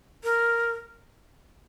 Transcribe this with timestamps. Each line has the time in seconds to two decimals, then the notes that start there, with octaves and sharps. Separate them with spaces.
0.24 A#4